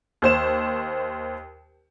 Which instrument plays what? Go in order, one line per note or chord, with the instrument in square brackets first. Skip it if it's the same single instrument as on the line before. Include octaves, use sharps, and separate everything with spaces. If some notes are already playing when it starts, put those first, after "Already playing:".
[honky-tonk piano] D#2 C5 E7